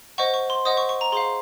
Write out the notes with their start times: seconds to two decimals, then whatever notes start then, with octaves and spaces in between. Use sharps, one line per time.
0.18 C5 D#5 F#5 C#6
0.34 C#6
0.50 C6
0.65 C5 D#5 F#5 D#6
0.77 C#6
0.89 C#6
1.01 A#5
1.12 G#4 C5 F5 C6